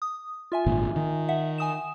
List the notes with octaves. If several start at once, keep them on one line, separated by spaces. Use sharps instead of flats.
D#6
F4 E5 G#5
G#1 A#2
D#3
E5 F#5
G#5 D#6 E7